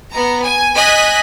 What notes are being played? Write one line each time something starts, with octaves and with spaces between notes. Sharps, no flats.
B3 A#5
G#5
D#5 G#5 F#6 B6